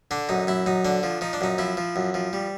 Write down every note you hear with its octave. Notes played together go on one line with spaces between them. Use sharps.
D3 D4
F#2 D#4
F#2 E4
F#2 D#4
D3 D4
F3
F3 D#4
D4
F#2 D#4
F3 E4
F3
F#2
F3
G3